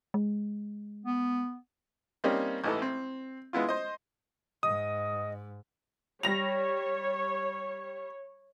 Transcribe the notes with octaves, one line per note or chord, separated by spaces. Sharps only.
G#3
B3
G3 A#3 C4 C#4 D#4 G4
A1 E3 D#4 A4
C4
G#3 B3 E4 F4
C5 D#5
G#2 D#5 D#6
G3 C#5 A#6 F7